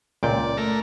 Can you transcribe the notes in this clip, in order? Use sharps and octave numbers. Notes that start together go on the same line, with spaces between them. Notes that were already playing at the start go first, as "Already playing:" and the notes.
C#2 A#2 D5 G5
A3 A#4